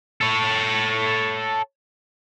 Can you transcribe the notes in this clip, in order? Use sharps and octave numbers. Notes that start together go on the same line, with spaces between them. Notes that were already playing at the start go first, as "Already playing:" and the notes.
A4 C#5